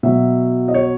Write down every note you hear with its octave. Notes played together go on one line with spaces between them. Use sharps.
B2 F#3 E5
D#5
C#5